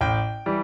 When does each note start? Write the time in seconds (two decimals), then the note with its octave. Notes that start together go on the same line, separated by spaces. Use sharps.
0.01 A1 G5
0.46 E3 G3